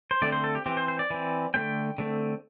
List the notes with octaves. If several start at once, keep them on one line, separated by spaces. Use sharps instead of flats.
C5
D3 A3 C4 D5
C5
A4
G4
E3 C4 G4
C5
C5
D5
E3 C4
D3 A3 C4 G5
D3 A3 C4